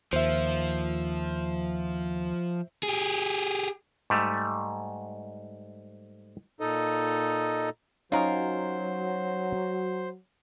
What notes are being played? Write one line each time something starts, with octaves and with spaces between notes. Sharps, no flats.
D#2 F3 C5 E5
G4 G#4
G#2 G3 A3
A#2 D#4 A4 D#5
F#3 C#4 D#4 F4 A#4 C5 G#5